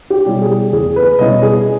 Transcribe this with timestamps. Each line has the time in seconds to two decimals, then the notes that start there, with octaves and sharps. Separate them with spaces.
0.10 G4
0.25 B2 G3 C#4 E4
0.42 G#4
0.72 E2 G#4
0.96 B4
1.19 B2 G3 C#4 E4 D#5
1.42 G#4